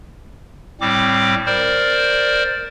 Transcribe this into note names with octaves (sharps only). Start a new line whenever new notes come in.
A2 G3 C4 D6
A#4 C5 D5